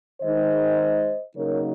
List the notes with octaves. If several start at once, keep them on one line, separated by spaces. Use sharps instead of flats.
D#3 G#3 D#4 C5 D#5
C#3 F#3 A#3 D#4 A#4 C#5